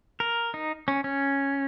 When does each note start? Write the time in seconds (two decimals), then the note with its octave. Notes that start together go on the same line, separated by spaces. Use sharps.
0.20 A#4
0.54 D#4
0.88 C#4
1.04 C#4